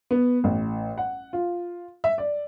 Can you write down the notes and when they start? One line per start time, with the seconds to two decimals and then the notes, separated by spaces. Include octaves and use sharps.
0.11 B3
0.44 A1
0.98 F#5
1.33 F4
2.04 E5
2.18 D5